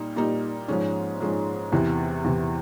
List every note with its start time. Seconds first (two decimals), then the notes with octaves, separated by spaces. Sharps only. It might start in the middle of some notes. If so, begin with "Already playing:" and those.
Already playing: A#2 G3 A#3 D#4
0.16 A#2 G3 A#3 D#4
0.68 G#2 F3 G#3 C#4
1.20 G#2 F3 G#3 C#4
1.72 E2 C3 E3
2.24 E2 C3 E3